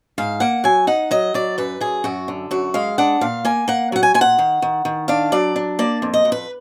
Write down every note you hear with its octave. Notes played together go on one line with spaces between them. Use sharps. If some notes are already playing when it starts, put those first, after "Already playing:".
G#2 F5
A#3 F#5
F#3 G#5
D#4 F#5
F#3 D#5
F#3 D5
F#2 B4
F#2 G#4
F#2 F#4
D3
F#2 F#4
G#3 F5
D4 F#5
A#2 F5
A#3 G#5
A#3 F#5
F#3 F#5
G#5
A#2 G#5
F#5
D#3
D#3
D#3
D4 F5
F#3 D5
D4
A#3 D5
F2
D#5
F2
B4